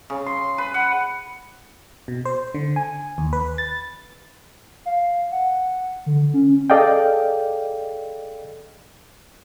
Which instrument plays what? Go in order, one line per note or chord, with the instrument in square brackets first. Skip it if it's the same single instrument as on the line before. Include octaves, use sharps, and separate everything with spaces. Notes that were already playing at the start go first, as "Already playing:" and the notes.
[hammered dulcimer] C#3
C6
B4
F#5
[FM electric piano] B2
C5
D3
G#5
D#2
B4
A6
[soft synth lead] F5
F#5
D3
C#4
[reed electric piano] G#4 A4 D5 D#5 F5 G5